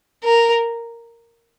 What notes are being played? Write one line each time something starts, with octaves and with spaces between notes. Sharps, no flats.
A#4